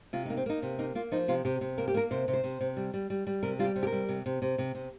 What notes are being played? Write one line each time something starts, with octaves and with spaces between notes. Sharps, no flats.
C3 F4
A#3 D#4
C4
A#3 D#4
C3
A#3 D#4
A#3 F4
F3 D#4
C3 F4
C3 G4
C3
A#3 A#4
G4
A#3 A#4
C3 C5
C3
C5
C3
C3
G3
G3
G3
G3
C3 A#4
G3 F4
G4
C3
G4
A#4
G3
C3
C3
C3
C3
C3